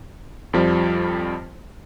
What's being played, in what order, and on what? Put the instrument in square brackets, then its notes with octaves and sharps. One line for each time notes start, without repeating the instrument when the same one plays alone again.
[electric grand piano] F2 F3 G3